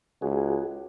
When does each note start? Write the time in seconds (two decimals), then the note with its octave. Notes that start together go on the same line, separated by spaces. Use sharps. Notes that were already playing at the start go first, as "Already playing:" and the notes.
0.22 C#2 F#4 G#4